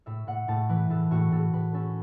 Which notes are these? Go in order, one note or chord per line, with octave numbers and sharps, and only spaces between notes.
A2 E5
A2 F#5
A2 A5
E3 B4
A2 A4
A2 F#4
A2 A4
A2 B4
C#4 A4